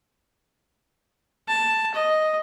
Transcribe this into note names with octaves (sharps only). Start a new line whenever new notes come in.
A5
D#5